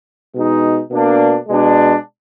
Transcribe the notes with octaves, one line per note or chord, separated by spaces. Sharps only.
B2 G#3 D#4
B2 A#3 D4
B2 G#3 D4